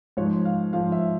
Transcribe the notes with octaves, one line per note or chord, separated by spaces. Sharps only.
G#2 F3 C#5
F5
G#2 F3 F5
E5